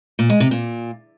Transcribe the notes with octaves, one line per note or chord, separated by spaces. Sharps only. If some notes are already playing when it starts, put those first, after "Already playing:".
A#2
G#3
C3
A#2